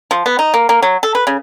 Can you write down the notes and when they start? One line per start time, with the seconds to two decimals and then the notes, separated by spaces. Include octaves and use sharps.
0.11 F3
0.26 B3
0.39 D#4
0.54 A#3
0.69 A#3
0.82 F#3
1.03 A4
1.15 B4
1.27 C#3